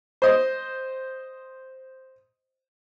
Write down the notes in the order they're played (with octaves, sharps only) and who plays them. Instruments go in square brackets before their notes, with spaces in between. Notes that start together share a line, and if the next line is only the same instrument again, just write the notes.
[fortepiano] C5 D#5